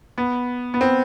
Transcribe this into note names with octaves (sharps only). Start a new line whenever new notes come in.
B3
B3
C4